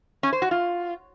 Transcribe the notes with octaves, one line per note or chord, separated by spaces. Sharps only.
C#4
C5
F#4
F4